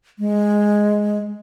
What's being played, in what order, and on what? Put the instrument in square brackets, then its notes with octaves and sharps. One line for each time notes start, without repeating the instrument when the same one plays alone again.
[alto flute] G#3